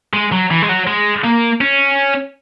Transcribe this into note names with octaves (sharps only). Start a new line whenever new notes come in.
G#3
F#3
E3
G#3
F#3
G#3
A#3
C#4